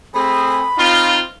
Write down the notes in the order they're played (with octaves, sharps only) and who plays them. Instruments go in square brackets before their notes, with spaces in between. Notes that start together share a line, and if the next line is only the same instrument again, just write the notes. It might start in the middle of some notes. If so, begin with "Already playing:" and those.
[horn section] A3 C4 G#4 [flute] B5
[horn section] C4 D#4 F4